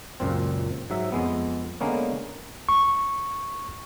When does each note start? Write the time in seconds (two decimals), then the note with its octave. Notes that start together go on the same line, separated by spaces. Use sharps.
0.20 C#2 F#2 A#2 C4
0.90 G#2 F#3 E5
1.12 F2 G#3 B3
1.81 D3 G#3 A#3 B3 C#4
2.69 C#6